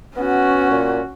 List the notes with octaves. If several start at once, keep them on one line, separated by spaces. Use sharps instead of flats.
B3 C#4 F#4
A#2